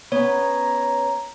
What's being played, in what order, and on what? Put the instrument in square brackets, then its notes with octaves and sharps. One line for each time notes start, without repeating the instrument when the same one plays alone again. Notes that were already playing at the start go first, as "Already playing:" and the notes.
[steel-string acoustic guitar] B3 C#4 [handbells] C#5 [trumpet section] A#5